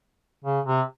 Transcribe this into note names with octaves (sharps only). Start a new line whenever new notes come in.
C#3
C3